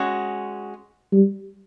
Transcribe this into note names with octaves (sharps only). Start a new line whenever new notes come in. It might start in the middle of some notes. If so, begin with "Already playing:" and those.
Already playing: G#3 C#4 F#4
G3